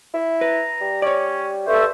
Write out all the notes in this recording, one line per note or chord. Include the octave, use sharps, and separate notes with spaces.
E4
B4 A#5
G3
C#4 C#5 D5
G2 A4 C5 E5 C#6